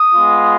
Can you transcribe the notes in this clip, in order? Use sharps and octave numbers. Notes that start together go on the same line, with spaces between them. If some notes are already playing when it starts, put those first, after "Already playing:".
Already playing: D#6
G#3 B3 F4